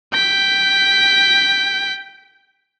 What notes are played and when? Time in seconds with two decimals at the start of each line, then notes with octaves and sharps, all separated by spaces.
0.12 G5 B6